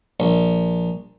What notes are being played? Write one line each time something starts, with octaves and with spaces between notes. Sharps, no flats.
A#1